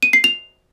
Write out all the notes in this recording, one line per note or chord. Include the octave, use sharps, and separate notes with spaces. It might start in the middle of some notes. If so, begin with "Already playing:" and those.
D#7
C7
F7